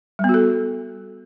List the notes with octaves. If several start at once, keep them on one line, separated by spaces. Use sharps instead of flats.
G3 B3 F#4 A4